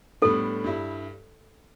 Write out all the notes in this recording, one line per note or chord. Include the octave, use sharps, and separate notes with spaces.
A2 G3 B3 D4 A4
G2 G3 E4